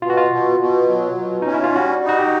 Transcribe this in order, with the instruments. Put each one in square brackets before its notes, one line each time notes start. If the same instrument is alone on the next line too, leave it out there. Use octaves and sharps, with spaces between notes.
[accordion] B2 [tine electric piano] F4
[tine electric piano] F#4
F4
[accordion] B2
B2
F#3
B2
[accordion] C#4 [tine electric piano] D#4
[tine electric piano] E4
F4
[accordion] G3 [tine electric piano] F#4
[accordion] D#4 [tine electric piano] F#4
[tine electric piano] G4